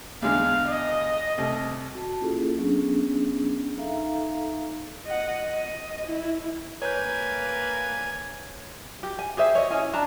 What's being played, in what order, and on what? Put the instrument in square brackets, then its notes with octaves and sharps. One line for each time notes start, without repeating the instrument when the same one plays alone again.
[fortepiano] E2 D3 G#3 [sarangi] F5
[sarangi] D#5
[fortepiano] C2 A3
[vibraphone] F#4 A5
A#3 C#4 E4 F4 G#4 A4
F#3 B3 C#4 D4 G#4
D#4 A4 E5 F5 A#5
[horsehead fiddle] D#5 F#5
D#5
E4
[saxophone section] A#3 B4 [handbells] C#5 G6 [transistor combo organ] G#5
[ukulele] G4
G#5
G4 G#4 C5 E5
C#5 D#5
C#4 E4 G#5
D4 A5 A#5